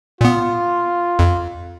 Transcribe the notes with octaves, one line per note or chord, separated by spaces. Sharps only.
A#2 B3 F4
F2